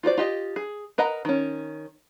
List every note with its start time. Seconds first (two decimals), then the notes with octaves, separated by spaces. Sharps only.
0.03 F4 F#4 C5 D5
0.17 F4 G4 D#5
0.56 G#4
0.98 A#4 B4 D#5 F#5 A#5
1.25 D#3 C#4